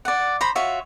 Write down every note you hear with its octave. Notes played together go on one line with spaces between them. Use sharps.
D5 F#5
C5 A#5 B5
F4 F#4 C#5 E5